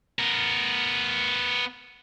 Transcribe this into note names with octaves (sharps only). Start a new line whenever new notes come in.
B3 A#4